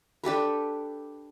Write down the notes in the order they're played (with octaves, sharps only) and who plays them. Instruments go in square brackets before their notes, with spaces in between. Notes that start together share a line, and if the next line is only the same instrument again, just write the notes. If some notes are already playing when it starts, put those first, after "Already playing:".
[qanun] D4 G4 A4 B4